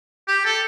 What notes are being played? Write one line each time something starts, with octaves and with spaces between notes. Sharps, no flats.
G4
A4